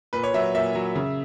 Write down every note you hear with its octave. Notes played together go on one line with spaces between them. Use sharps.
A#2 B4
C#5
F#3 E5
A#2 E5
F#3
C#3